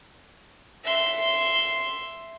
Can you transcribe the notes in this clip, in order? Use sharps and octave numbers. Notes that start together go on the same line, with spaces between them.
E5 C6